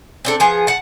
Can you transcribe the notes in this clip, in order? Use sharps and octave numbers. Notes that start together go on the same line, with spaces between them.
C4 D4 A4
F3 B3 G#4
F#5 A5